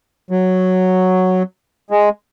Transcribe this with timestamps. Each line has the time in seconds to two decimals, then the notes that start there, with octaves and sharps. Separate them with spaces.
0.31 F#3
1.91 G#3